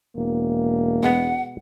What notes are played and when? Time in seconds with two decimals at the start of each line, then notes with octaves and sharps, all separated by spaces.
0.16 E1 A#3
1.03 B2 G#3 B3 F#5